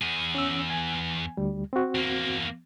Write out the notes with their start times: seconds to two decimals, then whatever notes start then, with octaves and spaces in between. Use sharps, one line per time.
0.02 E2 G#4
0.35 C#4 E6
0.70 G#5
1.37 D2 G3
1.73 C4 F#4
1.95 E2 A#3